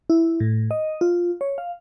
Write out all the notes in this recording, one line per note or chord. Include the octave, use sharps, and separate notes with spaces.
E4
A2
D#5
F4
C#5
F5